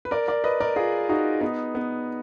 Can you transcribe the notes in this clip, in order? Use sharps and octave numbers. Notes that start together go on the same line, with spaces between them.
B4
A#4 D5
A#4 D5
B4 D#5
A#4 D5
F4 G#4
D#4 F#4
B3 D#4
B3